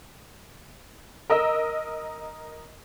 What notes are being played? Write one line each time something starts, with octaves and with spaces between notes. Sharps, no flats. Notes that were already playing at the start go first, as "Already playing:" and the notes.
A#4 D#5 E6